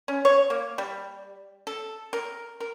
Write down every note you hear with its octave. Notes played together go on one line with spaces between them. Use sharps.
C#4
C#5
A#3
G3
A4
A#4
A#4